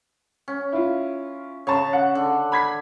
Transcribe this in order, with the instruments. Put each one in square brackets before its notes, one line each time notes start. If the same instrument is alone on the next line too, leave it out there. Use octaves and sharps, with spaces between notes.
[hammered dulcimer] C#4
[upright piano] E4 F4
[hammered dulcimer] C#3 [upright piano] C#5 A5
[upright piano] F#5
[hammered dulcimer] D3
[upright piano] B5 G#6 B6